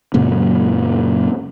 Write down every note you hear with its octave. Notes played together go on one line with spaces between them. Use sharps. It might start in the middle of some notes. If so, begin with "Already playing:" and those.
F#2 A#2 C#3 F#3